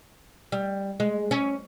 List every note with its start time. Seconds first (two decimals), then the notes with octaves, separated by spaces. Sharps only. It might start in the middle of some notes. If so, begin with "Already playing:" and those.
0.52 G3
1.00 G#3
1.31 C#4